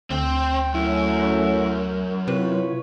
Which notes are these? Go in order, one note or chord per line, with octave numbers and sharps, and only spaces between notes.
D2 C4 G5
F#2 A3 C#4 E4 F#4
C3 E4 F4 B4 C#5